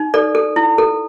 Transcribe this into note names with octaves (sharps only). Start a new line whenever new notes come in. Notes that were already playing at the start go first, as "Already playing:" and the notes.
Already playing: D#4
A4 D5
A4
E4
A4